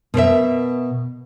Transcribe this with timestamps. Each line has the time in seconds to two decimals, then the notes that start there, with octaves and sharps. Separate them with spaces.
0.14 B2 A#4 C5 E5